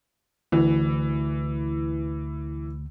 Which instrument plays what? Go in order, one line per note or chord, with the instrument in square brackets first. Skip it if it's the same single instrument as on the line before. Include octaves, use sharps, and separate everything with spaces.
[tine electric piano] D2 [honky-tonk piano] E3